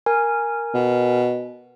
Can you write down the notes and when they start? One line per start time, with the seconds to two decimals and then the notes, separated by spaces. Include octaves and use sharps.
0.06 A#4 G#5
0.74 B2